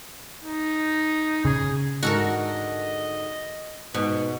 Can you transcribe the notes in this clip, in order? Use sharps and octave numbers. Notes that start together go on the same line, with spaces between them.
D#4
C#3 G#4
G#2 D3 F#4 A4 A#4 D#5 F#5
G#2 B2 B3